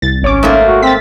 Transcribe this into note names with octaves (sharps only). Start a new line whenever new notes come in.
C2 A6
G#1 C#4 C#5 D6
G#2 A3 A#3
F#4
C4 A6 B6